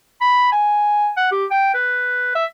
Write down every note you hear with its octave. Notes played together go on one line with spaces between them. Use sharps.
B5
G#5
F#5
G4
G5
B4
E5